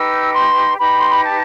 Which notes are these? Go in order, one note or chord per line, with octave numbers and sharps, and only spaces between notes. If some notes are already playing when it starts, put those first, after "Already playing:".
Already playing: D#4 G4 B4 E6
C6
D#4 G4 B4 B5
C6
B5
A5